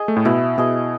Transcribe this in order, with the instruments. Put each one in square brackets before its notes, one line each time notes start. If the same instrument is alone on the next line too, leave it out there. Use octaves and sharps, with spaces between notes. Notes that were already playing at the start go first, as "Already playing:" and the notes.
Already playing: [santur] G#4 D#5
[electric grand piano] A3
A2
[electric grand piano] B2 [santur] E4
[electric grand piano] B2 [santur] G#4 D#5